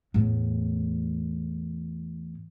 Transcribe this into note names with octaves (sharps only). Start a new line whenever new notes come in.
E2 A2